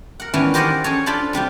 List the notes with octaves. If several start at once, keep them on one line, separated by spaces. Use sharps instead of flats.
A#4 F#5
D#3 E3 B3 C#4 D4 E4
G4 A#4 C5 D5 D#5 F#5
C#4 G#4 A4 C#5
D4 F4 A4 C5 B5
C3 G3 F4 G4